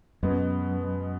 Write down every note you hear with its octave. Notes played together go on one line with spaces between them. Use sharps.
F#2 B2 G#3 B3